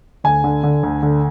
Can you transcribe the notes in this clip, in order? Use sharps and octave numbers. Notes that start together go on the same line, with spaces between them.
D2 G#5
D3
D3
D2
D3